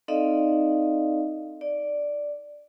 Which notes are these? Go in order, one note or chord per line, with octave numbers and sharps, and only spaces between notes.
C4 D#4 A4 D5 D#5 F5
D5